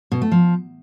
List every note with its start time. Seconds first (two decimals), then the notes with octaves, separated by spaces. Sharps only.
0.12 B2
0.22 A3
0.32 F3